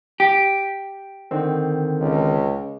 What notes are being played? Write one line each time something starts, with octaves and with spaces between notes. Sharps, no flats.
G4
D3 D#3 C4
C#2